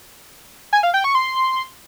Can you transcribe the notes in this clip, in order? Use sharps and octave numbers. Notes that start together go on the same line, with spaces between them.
G#5
F5
G5
C#6
C6